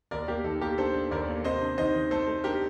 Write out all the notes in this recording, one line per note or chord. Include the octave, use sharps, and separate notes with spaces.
D#2 A#4 D5
A#3 G4 A#4
D#3 A4
A#3 G4 A#4
D4 A4 C5
D4
D#2 A#4 D5
A#3
C3 C5 D#5
D4
D#3 C5 D#5
D#3
A3 A4 C5
A3
D4 G4 A#4